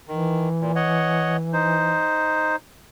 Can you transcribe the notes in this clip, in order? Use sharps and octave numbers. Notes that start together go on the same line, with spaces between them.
D#3 E3
A#2
C#5 D#5 F#5
D#4 C5